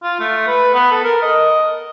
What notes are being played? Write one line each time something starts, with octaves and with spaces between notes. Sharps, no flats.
F4
A3
B4
B3
A4
A#4
D#5